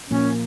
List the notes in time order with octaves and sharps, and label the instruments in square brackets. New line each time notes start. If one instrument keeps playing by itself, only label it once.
[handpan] A#2 F3 A#3 [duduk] C#4